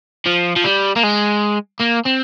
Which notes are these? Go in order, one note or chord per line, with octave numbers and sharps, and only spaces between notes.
F3
F3
G3
A#3
G#3
A#3
C4